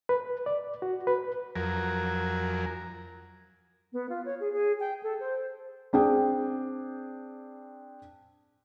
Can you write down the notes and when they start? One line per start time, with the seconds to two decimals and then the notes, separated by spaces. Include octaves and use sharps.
0.09 B4
0.46 D5
0.82 F#4
1.07 B4
1.56 F2 F#3 A#4 G#5
3.93 B3
4.09 F4
4.25 C#5
4.40 G#4
4.53 G#4
4.80 G5
5.03 A4
5.20 C5
5.93 C4 D4 G#4 G5